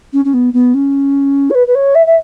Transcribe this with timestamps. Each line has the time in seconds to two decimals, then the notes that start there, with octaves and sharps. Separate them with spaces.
0.13 C#4
0.25 C#4
0.34 B3
0.53 B3
0.74 C#4
1.50 C#5
1.55 B4
1.67 B4
1.75 C#5
1.95 E5
2.06 E5